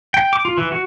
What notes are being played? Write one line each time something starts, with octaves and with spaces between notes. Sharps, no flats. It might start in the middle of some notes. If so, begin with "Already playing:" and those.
G5
D6
F4
E3
F#4